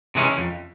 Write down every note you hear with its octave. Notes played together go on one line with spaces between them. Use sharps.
C3 E3 G#3 C#4
F2